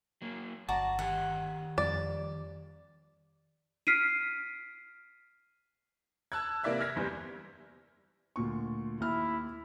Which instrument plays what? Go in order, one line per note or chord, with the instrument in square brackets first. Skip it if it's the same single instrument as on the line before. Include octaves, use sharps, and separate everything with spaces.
[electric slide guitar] F#3 A#3
[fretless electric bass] G1 [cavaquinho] F#4 D5 A#5 [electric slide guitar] A5
[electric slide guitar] D#3 G4 G#5 [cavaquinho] F#5
[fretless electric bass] F2 G3 [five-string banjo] D5
[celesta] F6 B6 C7 D7 D#7
[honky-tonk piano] A5 E6 F#6 G#6
C3 A#3 E4 D5 E5 E6
F6 G#6 A#6 B6
F#1 E2 G3 G6
[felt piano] D2 A#2 C#6
[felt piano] D#2 F6 [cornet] E4